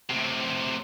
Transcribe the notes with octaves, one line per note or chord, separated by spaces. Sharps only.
A2 C3